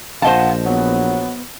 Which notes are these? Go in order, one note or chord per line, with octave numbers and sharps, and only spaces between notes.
A#1 F4 C5 D#5 F#5 A5
F#3 B3